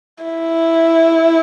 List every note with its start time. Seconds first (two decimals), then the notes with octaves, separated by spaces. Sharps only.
0.24 E4